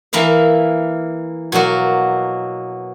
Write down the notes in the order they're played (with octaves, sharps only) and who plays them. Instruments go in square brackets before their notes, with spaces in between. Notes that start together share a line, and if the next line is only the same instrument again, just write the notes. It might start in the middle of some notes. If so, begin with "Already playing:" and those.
[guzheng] E3 A#3 E4 A#4 F5
B2 F#3 A#3 F#4